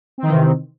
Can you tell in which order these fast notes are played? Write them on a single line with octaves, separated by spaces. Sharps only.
C4 D#3 E3 C3